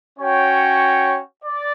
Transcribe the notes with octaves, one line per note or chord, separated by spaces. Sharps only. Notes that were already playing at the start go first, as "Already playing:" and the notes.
C#4 F#4 C#5 G5
D5